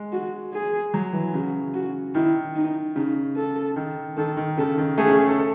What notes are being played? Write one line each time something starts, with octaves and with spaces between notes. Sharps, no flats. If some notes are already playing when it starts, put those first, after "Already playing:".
Already playing: G#3
F#4
G#4
F#3
E3
C#3 F#4
F#4
D#3 E4
D#4
C#3 D#4
A4
D#3
D#3 A4
D#3
C#3 A4
D#3
A3 G#4
C#4
G#4
A4
A4